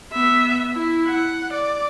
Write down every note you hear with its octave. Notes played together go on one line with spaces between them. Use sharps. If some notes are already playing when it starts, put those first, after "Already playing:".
B3 E5
E4
F#5
D5